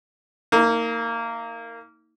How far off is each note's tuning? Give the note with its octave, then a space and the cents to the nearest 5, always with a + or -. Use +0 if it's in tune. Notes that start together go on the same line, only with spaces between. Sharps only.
A#3 -20 D#4 +35